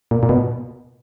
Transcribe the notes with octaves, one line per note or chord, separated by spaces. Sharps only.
A#2
A#2
B2